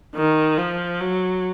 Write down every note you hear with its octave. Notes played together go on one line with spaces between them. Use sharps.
D#3
F3
F#3